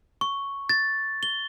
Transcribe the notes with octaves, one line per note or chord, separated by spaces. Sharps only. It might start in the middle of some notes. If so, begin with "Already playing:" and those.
C#6
A6
G7